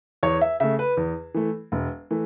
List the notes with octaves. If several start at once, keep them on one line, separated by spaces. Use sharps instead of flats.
E2 C#5
E5
C#3 A3 E5
B4
E2
E3 A3
E1
E3 A3